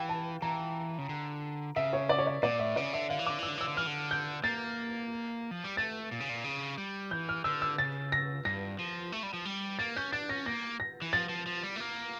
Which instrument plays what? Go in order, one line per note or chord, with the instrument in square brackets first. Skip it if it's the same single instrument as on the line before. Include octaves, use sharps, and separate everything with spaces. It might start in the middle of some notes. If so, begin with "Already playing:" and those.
Already playing: [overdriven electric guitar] E3 [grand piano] F5 G5
[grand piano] A5
[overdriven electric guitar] E3 [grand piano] A#5
[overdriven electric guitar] C#3
D3
[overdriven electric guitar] C#3 [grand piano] E5
[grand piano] C#5
D5
C#5
D5
[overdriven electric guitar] A#2 [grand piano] D5
[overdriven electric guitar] A2 [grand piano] E5
[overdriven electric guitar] C#3 [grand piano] D5
[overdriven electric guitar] D3 [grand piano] E5
[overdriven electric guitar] D3 [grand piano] F5
[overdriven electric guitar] E3
[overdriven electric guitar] D3 [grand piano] D6
[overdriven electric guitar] E3 [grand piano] E6
[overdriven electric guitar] D3
[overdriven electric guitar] E3 [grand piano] E6
[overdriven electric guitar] D3
[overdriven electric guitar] E3 [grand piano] F6
[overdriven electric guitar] D3
[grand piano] G6
[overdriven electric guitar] A#3 [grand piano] A6
[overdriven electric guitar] F3
G3
[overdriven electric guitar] A3 [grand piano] A6
[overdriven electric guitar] A#2
C#3
A#2
C#3
G3
[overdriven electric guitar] E3 [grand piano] G6
[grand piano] F6
[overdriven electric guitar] D3 [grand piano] E6
[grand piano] E6
[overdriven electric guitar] C#3 [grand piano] A6
[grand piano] A#6
[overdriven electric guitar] G2 [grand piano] A#6
[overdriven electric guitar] F3
A3
G3
F3
G3
[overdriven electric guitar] A#3 [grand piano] A6
[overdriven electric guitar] C#4 [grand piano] G6
[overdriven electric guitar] D4 [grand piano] A6
[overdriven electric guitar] C#4 [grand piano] A#6
[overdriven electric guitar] A#3 [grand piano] A#6
[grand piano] A#6
[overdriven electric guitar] E3
[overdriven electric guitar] F3 [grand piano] A6
[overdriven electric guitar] F3
F3
G3
A3
A#3